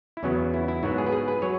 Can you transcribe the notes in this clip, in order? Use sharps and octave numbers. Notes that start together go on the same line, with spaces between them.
E4
E2 C#3 F#3 B3 C#4
E4
E4
G#2 F#3 B3 F#4
G#4
B4
G#4
B4
F#3 C#5